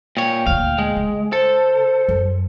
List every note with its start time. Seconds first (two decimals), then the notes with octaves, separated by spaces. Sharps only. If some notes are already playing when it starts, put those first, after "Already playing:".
0.17 A#2 C#5 G5
0.47 D2 A#2 F5
0.78 G#3
0.96 C#3
1.33 A4 C5
2.09 F#2